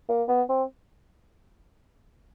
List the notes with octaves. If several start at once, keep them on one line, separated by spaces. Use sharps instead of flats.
A#3
B3
C4